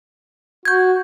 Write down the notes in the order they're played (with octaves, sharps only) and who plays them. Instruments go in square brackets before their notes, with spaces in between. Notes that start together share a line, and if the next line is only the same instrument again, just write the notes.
[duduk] F#4 [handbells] G6 G#6